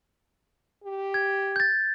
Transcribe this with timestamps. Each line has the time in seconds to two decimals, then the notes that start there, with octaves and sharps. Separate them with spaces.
0.84 G4
1.14 G#6
1.56 G6 A6